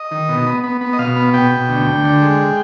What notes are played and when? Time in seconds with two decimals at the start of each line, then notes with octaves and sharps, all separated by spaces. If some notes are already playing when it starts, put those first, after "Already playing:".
Already playing: D#5
0.11 D#3
0.29 B2
0.47 B3
0.64 B3
0.81 B3
0.93 D#5
0.99 B2 F5
1.16 B3
1.34 B2 G5
1.51 B2
1.69 D2
1.87 D2
2.04 D3
2.22 G#3